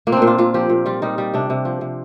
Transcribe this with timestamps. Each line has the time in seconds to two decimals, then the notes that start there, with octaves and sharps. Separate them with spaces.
0.07 A#2 A#3
0.12 C4 D4
0.22 A#2
0.27 F4
0.38 A#2 F4
0.54 F3 G4
0.70 A#2
0.86 G3 F4
1.02 G3 D#4
1.18 G3
1.34 C3 D4
1.50 C3
1.65 F3
1.81 C3